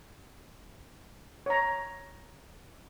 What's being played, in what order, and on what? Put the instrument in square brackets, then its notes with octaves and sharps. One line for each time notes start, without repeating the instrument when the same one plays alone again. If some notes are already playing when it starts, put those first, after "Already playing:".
[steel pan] C#5 A#5